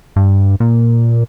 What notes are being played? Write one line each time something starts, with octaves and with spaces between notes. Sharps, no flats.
G2
A#2